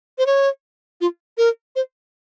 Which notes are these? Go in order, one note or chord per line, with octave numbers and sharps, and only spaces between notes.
C5
C#5
F4
A#4
C5